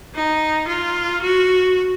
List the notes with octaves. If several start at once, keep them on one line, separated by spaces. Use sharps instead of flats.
D#4
F4
F#4